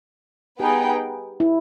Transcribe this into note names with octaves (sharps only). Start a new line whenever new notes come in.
B3 D#4 G4 G#4 B4 G5
E4